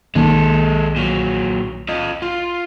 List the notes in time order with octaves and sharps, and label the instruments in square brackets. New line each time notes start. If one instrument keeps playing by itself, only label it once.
[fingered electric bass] B1 D#3 A#3 [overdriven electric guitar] G#3 A4
[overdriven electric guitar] A#2 F#3
F4 D#5
F4